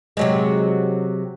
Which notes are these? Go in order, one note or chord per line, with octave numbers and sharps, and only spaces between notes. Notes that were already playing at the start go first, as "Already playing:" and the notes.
C3 F#3 G#3